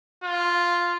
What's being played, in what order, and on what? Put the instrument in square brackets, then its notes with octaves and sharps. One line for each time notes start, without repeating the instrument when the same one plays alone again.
[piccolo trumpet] F4